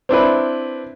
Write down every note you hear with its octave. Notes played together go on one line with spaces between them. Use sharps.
C4 D4 E4 B4